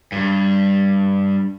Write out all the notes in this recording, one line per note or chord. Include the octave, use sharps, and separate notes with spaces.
G2